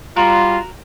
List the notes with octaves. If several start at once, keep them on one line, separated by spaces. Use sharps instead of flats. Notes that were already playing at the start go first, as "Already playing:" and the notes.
G3 F4 F#4 A#4